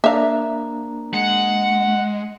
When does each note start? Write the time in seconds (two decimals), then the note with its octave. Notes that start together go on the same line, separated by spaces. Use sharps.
0.04 A#3 D4 E5 F5 A#5
1.13 G#3 F#5